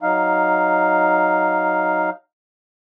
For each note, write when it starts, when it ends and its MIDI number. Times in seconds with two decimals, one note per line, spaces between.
0.02 2.10 54
0.02 2.10 63
0.02 2.10 77